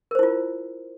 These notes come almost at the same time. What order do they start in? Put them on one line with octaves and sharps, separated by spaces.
A#4 C5 E4 F4